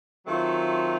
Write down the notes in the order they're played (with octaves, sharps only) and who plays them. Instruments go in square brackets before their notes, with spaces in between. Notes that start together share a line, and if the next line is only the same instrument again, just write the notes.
[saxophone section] D#3 F#3 A3 C4 F4